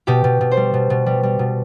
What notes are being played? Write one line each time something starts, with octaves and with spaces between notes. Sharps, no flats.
B2 G4
B2
B2
C5
G3
B2
B2
G3
G3
B2